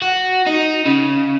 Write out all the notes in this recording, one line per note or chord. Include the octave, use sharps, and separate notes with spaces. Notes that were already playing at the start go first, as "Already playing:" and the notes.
F#4
D#4
C#3